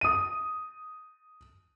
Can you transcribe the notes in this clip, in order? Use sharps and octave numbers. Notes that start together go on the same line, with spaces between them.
D#6 D#7